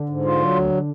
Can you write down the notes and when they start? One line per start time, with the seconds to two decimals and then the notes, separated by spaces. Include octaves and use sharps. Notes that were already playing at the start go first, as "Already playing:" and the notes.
Already playing: D3
0.09 G#2
0.25 F4
0.40 F#3
0.56 D2